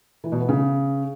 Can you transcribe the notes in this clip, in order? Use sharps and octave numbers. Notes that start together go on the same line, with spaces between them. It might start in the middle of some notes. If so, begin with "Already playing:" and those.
E3
B2
B3
C#3